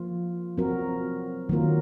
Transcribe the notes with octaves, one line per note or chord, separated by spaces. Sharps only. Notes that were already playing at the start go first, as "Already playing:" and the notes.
Already playing: F3 A#3 F4
F#3 C4 F#4 A#4
D#3 F#3 A#3 F4 A#4